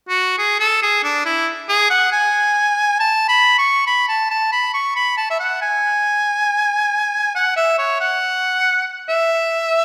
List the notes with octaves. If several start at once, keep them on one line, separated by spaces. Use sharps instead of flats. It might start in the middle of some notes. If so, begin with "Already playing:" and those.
F#4
G#4
A4
G#4
D4
E4
G#4
F#5
G#5
A5
B5
C#6
B5
A5
A5
B5
C#6
B5
A5
E5
F#5
G#5
F#5
E5
C#5
F#5
E5